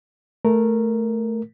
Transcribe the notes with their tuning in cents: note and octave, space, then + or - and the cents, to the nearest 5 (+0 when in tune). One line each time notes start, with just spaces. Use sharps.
A3 +0 A#4 +0